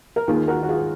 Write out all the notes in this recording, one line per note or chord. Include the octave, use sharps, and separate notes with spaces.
A#4
D#2 D#3 A#3 F4 G#4
F#4 A#4
F#4
F4 G#4